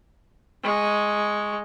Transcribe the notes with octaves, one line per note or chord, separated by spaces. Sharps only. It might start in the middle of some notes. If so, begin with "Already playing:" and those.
G#3 C#6